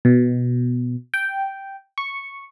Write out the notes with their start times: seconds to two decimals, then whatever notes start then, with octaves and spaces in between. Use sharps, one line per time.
0.05 B2
1.14 G5
1.98 C#6